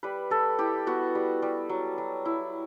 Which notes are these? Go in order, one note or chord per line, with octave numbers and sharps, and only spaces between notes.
G3 B4
G3 A4
E4 G4
B3 F#4
G3
G3
F#3
F#3
E4